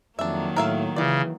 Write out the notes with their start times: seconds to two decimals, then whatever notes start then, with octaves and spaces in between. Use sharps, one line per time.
0.19 F2 D#3 F#3 A#3 D4 E5
0.56 A2 A#4 E5 F5
0.96 C#3 E3 F4 D5